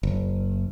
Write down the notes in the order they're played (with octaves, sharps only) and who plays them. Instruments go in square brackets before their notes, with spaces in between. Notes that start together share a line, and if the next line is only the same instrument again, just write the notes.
[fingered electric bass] F#1